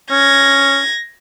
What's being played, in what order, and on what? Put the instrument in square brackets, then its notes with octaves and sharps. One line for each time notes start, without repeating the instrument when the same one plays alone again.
[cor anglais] C#4 [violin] G#6 A#6